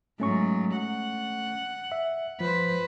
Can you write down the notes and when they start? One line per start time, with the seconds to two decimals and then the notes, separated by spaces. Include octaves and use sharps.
0.20 G#2 F#3 A3 C#4 C#6
0.76 F#5
1.92 E5
2.40 F3 B4 C5